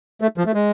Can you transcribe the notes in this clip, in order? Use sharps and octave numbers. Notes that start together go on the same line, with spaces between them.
A3
F3
A3
G#3